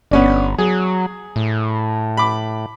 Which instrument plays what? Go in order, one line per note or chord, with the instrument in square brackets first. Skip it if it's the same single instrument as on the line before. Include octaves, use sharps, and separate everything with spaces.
[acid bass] G1 [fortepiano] B3 C#4 D4
[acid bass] F#3 [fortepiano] G#4
[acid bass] A2
[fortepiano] B5 D6